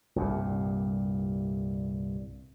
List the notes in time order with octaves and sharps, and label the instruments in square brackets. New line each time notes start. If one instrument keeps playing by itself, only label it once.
[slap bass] C2 G2 A#2